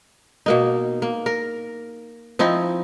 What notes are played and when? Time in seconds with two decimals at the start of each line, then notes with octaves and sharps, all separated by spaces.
0.46 B2 A#3 D#4
1.02 A#3
1.26 A#4
2.39 F3 C4 D#4 E4